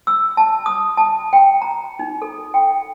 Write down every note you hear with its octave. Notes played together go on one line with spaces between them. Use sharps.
E6
A5
D#6
A5
G5
A#5
D#4
A4
G5